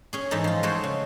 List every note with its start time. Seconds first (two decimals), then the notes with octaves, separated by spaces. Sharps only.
0.13 C#4 G#4
0.31 G#2 E3 D#4 A4
0.44 F3 F4
0.63 G#3 A3 F#4 A4 C5 C#5
0.84 C#3